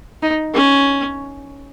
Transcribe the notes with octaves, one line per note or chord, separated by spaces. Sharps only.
D#4
C#4